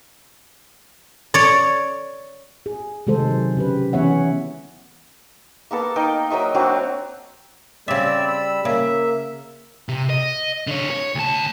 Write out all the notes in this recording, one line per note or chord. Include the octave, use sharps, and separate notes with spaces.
C#5 D5
G#4
C3 D#3 G#3 A4 C5
F#3
C#3 G4 B4
E3 B3 C#4 C#5 E5 F#5
A#3 B3 A4 A#4
D#4 A#4 D#5 G5
F#3 A#4 D#5 E5
F#3 C4 D4 F#4
C#3 G3 C4 D5 E5 E6
B5 E6
C#3 A#3 E5
C3
D#5
D3 C#5
C#5
D2 A5